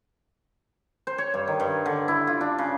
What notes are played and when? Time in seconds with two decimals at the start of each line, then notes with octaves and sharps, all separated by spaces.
1.07 C5
1.18 C#5
1.34 G2
1.48 D#3
1.60 G2
1.86 D3
2.08 E4
2.27 F4
2.41 D4
2.58 C#3